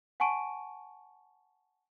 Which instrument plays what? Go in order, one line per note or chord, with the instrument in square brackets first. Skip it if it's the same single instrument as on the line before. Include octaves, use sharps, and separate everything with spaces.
[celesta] F#5 G#5 A5 C#6 D7 D#7